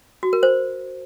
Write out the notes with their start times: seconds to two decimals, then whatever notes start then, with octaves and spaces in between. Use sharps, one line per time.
0.23 F#4
0.33 A#4
0.43 C5